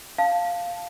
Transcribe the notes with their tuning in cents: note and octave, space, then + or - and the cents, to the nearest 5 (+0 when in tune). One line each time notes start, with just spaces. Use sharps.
F5 +0 A5 +0